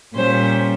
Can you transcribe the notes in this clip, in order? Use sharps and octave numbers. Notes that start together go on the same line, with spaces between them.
A#2 G3 C#4 C5